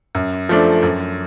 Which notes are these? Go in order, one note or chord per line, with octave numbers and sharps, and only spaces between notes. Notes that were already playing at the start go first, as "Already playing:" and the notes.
F#2
F3 A3 D4
F#2